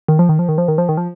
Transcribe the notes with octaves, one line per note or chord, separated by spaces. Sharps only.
D#3
F3
D#3
F3
D#3
F3
D#3
F3
D#3
F3